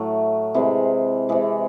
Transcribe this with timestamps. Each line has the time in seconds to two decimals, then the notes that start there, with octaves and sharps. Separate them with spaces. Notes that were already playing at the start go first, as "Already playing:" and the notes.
Already playing: A2 F#3 A3
0.54 C3 E3 G#3
1.29 C3 E3 G#3